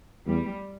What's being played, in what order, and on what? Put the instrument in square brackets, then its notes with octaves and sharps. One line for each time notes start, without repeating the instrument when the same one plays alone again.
[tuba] E2 [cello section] G3